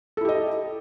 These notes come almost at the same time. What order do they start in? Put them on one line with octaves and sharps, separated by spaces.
A4 E4 G4 D#5